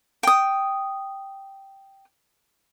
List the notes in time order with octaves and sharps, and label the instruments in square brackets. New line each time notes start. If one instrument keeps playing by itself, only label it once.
[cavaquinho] G5 D#6